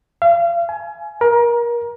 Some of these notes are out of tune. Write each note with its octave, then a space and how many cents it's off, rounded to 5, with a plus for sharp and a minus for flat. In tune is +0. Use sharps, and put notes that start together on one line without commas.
F5 -35
G#5 +25
A#4 +25